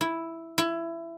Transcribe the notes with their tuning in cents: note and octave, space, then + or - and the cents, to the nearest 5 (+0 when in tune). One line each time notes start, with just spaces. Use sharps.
E4 +0
E4 +20